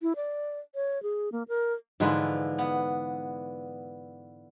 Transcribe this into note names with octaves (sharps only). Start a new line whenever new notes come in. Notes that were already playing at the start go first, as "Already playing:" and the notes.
E4
D5
C#5
G#4
A#3
A#4
G#2 D3 E3 F3 G#3 B4
B3